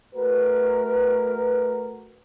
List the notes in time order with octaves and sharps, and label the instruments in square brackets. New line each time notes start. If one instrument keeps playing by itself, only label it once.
[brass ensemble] A3 F#4 A#4 B4